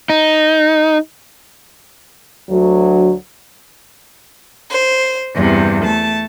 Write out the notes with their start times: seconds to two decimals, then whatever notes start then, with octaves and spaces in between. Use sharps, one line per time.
0.10 D#4
2.49 D2 F#3
4.70 C5
5.35 E2 G2 C3
5.85 A3 A5